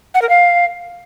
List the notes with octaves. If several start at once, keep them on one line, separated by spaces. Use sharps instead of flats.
F#5
A#4
F5